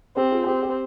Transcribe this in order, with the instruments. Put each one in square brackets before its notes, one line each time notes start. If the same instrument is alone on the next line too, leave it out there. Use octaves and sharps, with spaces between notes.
[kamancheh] C4 [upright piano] G4
[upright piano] F4 G#4
[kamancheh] C4 [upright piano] G4
[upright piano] G4